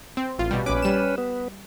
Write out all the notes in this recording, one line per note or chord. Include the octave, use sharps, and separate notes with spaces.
C4
A1 F4
B2 G3
A#1 C#4 B4 D6
G3 E7
B3